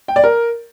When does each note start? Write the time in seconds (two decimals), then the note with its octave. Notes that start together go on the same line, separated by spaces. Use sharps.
0.08 G5
0.16 D5
0.24 A#4